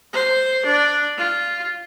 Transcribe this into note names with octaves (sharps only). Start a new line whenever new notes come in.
C5
D4
F4